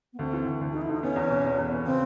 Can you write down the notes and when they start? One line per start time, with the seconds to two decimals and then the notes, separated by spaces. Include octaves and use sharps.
0.13 B3
0.19 D2 C4
0.33 E3
0.47 D2
0.61 D2
0.72 D#4
0.75 E3
0.82 E4
0.89 D2 D#4
1.03 B3 C#4
1.16 E2
1.30 B2
1.45 E2
1.58 E2
1.71 B3
1.85 C#3 C4